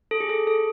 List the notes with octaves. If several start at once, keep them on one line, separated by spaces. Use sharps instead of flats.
A4
G#4
A4
A4